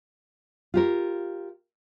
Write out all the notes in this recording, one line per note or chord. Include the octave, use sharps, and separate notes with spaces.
F4 G4 A#4